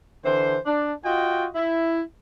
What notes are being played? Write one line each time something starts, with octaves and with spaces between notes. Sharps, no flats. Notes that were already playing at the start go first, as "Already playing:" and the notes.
D3 E3 C5
D4
F4 F#4 D#5 G5
E4